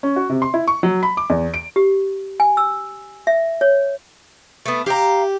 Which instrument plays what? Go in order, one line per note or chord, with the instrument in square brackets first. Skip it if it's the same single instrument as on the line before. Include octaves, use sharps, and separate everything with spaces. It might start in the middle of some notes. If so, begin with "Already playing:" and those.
[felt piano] C#4
F#4
C3
C6
E4
C#6
F#3
B5
D6
E2
D7
[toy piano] G4
G#5
E6
E5
C#5
[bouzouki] A3 B3
[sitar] G4 [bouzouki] F5 A#5